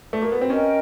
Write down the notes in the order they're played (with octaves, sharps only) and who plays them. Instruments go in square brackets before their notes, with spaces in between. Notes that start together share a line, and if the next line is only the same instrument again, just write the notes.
[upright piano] A3
A#3
B3
C4
[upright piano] C#4 [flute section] A#4 D#5 G5